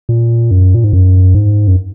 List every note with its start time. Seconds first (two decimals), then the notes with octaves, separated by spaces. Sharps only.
0.09 A#2
0.51 F#2
0.75 A#2
0.84 G#2
0.93 F#2
1.35 G#2
1.68 F#2